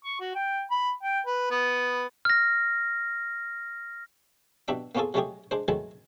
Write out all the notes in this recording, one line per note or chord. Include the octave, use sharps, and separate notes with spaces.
C#6
F#4
G5
B5
G5
B4
B3
F6 A#6
B2 G3 D4 E5 D6
A#3 B3 C#4 F4 G#4 A4
F#3 G#3 A3 C#4 G4 G#4
G#3 D4 C5
D#3 E3 F#3 G#3 A3 E4